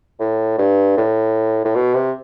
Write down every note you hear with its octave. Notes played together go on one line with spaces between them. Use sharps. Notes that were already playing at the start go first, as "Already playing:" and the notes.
A2
G2
A2
A2
B2
C3